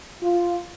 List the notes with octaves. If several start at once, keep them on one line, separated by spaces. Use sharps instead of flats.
F4